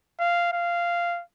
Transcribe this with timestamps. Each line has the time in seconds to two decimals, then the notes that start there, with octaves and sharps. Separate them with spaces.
0.20 F5
0.53 F5